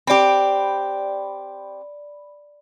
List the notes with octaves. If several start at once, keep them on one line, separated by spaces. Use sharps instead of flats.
C4 G4 D5 B5